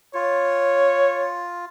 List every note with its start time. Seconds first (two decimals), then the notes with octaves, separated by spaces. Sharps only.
0.14 F4 C#5